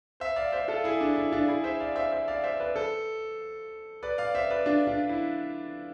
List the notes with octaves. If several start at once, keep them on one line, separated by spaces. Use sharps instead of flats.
C5 E5
D5 F5
C5 E5
F4 A4
E4 G#4
D4
E4
D4 F4
E4 G#4
C5 E5
D5 F5
C5 E5
C5 E5
D5 F5
C5 E5
B4 D5
A4 C5
B4 D5
D5 F5
C5 E5
B4 D5
D4 F4
D4 F4
E4